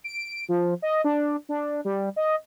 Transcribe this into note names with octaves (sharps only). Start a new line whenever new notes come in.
D7
F3
D#5
D4
D4
G3
D#5